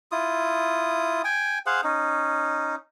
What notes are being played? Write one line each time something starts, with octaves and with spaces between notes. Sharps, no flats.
E4 F4 D#6
G5 G#5
G#4 C5 F5 F#5
C#4 D#4